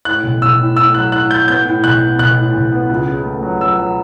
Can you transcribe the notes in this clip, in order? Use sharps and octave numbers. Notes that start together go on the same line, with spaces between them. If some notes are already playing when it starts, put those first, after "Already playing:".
A2 F#6
B1
B1 E6
A2
A2 E6
F#3 F#6
A2 F#6
A2 G6
B3 G6
A2
B1 F#6
B3
B1 F#6
A2
B1
B3
C#2
C#3
A3
F#3
F#3 E6
F#3